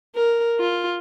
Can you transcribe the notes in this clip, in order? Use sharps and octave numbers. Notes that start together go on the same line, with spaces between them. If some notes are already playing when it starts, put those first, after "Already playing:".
A#4
F4